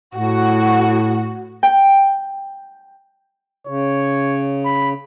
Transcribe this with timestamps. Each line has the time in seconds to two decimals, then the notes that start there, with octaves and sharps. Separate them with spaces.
0.15 A2 F#4
1.63 G5
3.67 C#3 C#5
4.65 B5